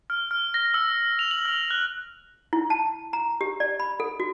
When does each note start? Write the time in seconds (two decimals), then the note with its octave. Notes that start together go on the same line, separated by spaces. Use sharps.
0.10 F6
0.31 F6
0.54 A#6
0.74 E6
1.19 F7
1.31 F#7
1.45 F6
1.71 F#6
2.53 E4
2.70 A5
3.13 A#5
3.41 G4
3.60 D5
3.80 B5
4.00 A4
4.20 F#4